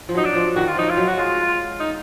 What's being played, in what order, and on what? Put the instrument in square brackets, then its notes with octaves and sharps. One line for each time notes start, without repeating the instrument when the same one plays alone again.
[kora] F3
[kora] F#3 [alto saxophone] D#4
[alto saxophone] D4
[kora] F3
[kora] D#3 [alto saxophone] F#4
[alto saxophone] F4
[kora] F3 [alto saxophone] D#4
[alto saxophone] F4
[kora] F#3
[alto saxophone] F#4
[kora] G#3 [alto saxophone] F4
[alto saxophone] D#4